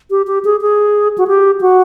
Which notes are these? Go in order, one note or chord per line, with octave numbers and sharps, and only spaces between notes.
G4
G4
G#4
G#4
F#4
G4
F#4